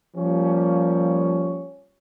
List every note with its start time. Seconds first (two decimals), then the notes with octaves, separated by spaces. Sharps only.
0.16 F3 G3 A#3 C#4 G4